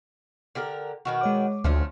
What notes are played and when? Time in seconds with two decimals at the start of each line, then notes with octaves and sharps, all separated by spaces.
0.55 D3 G4 A#4
1.05 B2 D#3 F#4
1.21 G#3 C#5 D6
1.64 D2 F3 A3 C#4